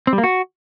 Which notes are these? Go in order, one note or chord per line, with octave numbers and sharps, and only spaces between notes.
C4
G3
A#3
F#4